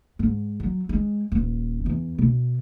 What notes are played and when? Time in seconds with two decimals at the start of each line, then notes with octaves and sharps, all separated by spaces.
0.19 G#2
0.60 F#3
0.89 G#3
1.32 D#1
1.86 E2
2.18 B2